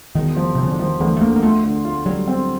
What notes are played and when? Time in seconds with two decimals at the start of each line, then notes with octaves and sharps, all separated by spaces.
0.15 E1 D#3
0.36 F3
0.55 C3 F3
0.63 C#3
0.71 D3
0.79 D#3 F3
1.00 D2 E3
1.17 A3
1.21 D3 A#3
1.36 A#3
1.42 A3 F4
1.64 D3
1.85 F4
2.05 F#3 G3
2.28 C4